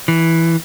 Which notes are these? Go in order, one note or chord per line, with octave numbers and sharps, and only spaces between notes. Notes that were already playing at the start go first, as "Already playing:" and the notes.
E3